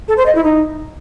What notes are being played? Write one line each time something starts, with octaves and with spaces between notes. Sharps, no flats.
A4
C5
D#5
E4
D#4